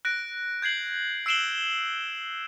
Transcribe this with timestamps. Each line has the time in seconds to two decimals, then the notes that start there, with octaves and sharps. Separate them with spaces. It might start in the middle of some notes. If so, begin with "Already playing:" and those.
0.05 F#6 A#6 D7
0.62 G6 G#6 C7 F#7
1.26 E6 C7 D7 E7 F#7 G7